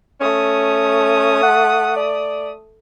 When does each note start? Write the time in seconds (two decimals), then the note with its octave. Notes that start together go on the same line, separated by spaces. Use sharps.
0.20 A3 C#4 D#6
1.43 F#5
1.96 D5